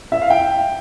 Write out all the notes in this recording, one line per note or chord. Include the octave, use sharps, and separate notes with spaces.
E5
F5
G5